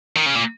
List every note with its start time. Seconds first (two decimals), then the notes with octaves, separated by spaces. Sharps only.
0.16 D#3
0.26 C#3
0.36 A#2